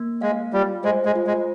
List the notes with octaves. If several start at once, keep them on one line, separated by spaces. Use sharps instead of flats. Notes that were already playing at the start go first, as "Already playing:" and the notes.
Already playing: A#3
G#3 F5
G3 F4
G#3 C5
G#3
F4
G#3